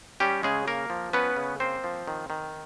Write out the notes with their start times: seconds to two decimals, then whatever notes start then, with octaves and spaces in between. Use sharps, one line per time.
0.20 G3 C#4 G4
0.43 C#3 G#3 G#4
0.68 A#3 A#4
0.90 F3
1.13 B3 C#4 B4
1.36 C#3
1.60 A#3 C4 C5
1.84 F3
2.08 D#3
2.30 D#3